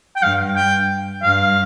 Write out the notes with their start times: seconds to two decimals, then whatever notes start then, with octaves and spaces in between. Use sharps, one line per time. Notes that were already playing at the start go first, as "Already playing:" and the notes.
0.16 G5
0.22 G2 F5
0.56 G5
1.22 G2 F5